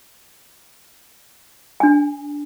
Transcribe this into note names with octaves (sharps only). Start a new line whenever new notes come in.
D4 G#5